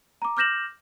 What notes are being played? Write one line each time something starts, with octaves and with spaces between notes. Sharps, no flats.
A#5 D6
D6 F6 G6 A#6 E7 F#7